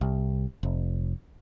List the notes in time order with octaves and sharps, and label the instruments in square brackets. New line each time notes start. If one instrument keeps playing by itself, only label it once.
[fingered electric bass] C2
F1